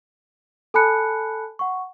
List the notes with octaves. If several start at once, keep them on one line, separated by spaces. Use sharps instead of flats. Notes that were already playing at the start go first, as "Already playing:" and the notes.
A4 G#5 A5 B5 F#6 C#7
F#5 C#6